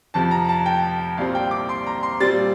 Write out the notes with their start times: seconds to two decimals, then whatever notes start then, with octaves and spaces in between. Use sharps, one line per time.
0.14 F2 C3 F3 A5
0.31 A#5
0.49 A5
0.66 G5
1.17 C2 A#2 G3 C4 F5
1.35 G5
1.51 D6
1.69 C6
1.87 A#5
2.03 C6
2.20 A#2 G3 C4 A6